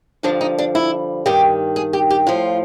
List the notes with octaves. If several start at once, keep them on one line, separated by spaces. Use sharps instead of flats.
G2 D3 F3 D4
D#4
D4
E4
G2 D#3 G4
G#4
G4
G4
A2 F3 F4